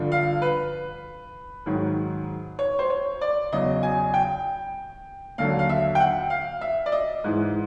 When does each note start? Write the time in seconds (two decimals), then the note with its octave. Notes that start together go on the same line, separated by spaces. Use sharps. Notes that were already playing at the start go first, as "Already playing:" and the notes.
Already playing: G2 D3 F3
0.12 F5
0.42 B4
1.66 G#2 D#3 F#3
2.59 C#5
2.79 C5
2.90 C#5
3.21 D5
3.53 E2 C#3 F#3 D#5
3.83 G#5
4.14 G5
5.38 D#2 D3 F#3 F5
5.59 F5
5.69 E5
5.95 G5
6.00 F#5
6.30 F5
6.61 E5
6.86 D5
6.92 D#5
7.24 G#2 E3